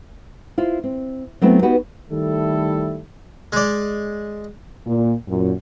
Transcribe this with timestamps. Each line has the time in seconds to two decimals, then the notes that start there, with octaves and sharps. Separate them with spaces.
0.58 E4 F4 C5
0.84 C4
1.42 F#3 A3 B3 C4 E4
1.62 B3 D#4 F#4 G4 B4
2.10 D#3 G3 A3 E4 A4
3.52 G#3 D5
4.86 A#2
5.27 F#2 A#2